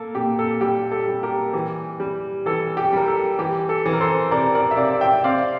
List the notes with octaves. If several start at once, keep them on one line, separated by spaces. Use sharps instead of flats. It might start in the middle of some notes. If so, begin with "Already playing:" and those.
Already playing: A#3 A4
A#2 G4
A4
G3 G4
A4
G3
G4 A#4
E3 G4
G3
E3 A4
G4
G3 A#4
A4
E3 G4
A4
E3
A#4
A4 C5
C3 A#4 D5
A#4 D5
E5
C3 D5 F5
E5 G5
C4 D5 F5